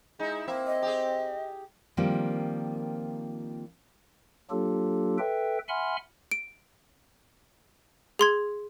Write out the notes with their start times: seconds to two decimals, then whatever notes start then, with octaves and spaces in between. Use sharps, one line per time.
0.19 G#3 D#4 E4
0.48 A#3 C4 E4 E5
0.67 D#5
0.82 G4 G#4
1.97 D#3 F3 G3 A#3 C4 F4
4.51 F#3 A#3 D4 F4 G4 A4
5.19 A4 B4 E5 G5
5.69 E5 F#5 G#5 B5 C6 F6
6.31 D7
8.19 G#4 C6 G#6